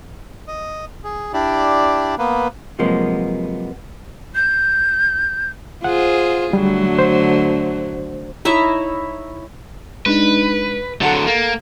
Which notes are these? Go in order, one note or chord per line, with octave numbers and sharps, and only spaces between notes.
D#5
G#4
D4 E4 G4 D5
A#3 B3 B4
C3 F3 F#3 G#3 A#3 B3
G6
F4 G#4 C5 F#5
D3 F#3 G3 A3
C5
D#4 E4 C#5 E5
G#3 D4 D#4 B4
D3 F#3 A4 F#5 A6
A#3